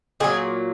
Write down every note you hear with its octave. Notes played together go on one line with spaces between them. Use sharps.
A#2 F#3 G#4